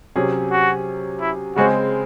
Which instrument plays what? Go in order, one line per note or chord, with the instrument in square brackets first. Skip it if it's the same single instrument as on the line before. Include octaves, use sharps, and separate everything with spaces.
[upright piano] C3 F#3 C#4 G#4
[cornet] F#4
E4
[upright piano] C#3 G#3 C4 [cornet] F#4